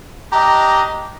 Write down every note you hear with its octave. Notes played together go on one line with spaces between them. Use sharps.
D4 G4 D#5 A#5